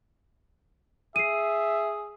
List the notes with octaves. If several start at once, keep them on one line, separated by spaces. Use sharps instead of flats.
G#4 E5 C7 D#7